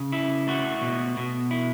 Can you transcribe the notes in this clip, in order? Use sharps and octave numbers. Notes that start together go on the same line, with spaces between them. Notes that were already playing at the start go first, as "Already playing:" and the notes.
Already playing: C#3
E4
A3 F#4
B2
B2
E4